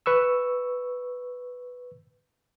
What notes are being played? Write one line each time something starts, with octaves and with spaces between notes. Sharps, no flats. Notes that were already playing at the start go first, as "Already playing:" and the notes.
B4 C#6 E6